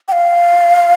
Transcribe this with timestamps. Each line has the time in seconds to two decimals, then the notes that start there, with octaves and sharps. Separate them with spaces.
0.08 G5
0.12 F5